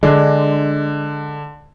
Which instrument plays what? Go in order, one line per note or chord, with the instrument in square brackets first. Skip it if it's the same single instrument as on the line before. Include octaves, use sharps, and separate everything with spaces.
[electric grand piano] D3 [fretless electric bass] G#3 [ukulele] D4